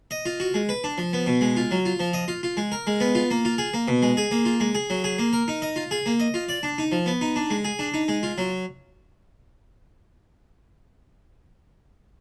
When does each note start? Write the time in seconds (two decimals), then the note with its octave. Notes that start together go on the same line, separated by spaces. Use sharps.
0.11 D#5
0.26 F4
0.40 F#4
0.54 G#3
0.69 B4
0.84 D4
0.98 F3
1.13 B3
1.26 B2
1.41 G#3
1.57 F4
1.71 F#3
1.85 F4
2.00 F3
2.13 D#5
2.28 F4
2.43 F4
2.57 G#3
2.72 A#4
2.87 G#3
3.00 B3
3.15 F4
3.31 A#3
3.45 F4
3.58 G#4
3.74 A#3
3.88 B2
4.02 G#3
4.17 G#4
4.31 A#3
4.45 F4
4.60 G#3
4.75 G#4
4.90 F#3
5.04 G#4
5.19 A#3
5.33 A#4
5.48 D#4
5.62 D#5
5.76 F4
5.91 G#4
6.06 A#3
6.20 D#5
6.34 F4
6.49 D5
6.63 D4
6.78 D#4
6.92 F3
7.06 B3
7.21 D#4
7.36 D4
7.50 G#3
7.64 G#4
7.79 D4
7.94 D#4
8.08 G#3
8.23 F4
8.38 F#3